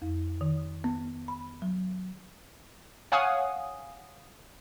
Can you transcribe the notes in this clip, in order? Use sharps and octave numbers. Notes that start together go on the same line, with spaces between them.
F2
D#3
B3
B5
F#3
C#5 F5 F#5 G#5 D#6